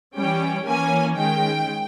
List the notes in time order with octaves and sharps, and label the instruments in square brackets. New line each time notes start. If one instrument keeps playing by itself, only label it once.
[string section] E3 G3 C#4 G5
E3 A#3 C#4 G#5
D#3 G#3 C#4 G5